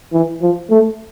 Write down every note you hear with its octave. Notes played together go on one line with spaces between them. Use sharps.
E3
F3
A3